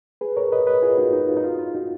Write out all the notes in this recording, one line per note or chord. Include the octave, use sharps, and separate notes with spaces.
G#4 B4
A#4 C#5
B4 D#5
B4 D#5
F4 G#4
D#4 F#4
D#4
F4
D#4
F4
F4
D#4 F#4